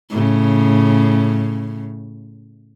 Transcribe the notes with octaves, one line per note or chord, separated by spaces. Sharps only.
A2 C#3